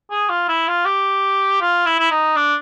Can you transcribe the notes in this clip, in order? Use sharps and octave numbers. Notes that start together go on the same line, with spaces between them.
G#4
F4
E4
F4
G4
F4
E4
E4
D#4
D4